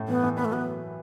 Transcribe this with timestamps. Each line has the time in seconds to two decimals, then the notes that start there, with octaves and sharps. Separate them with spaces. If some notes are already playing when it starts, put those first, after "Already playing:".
Already playing: A2
0.08 E3 B3
0.23 E3
0.37 B3 B4
0.45 A3
0.51 F#3 B3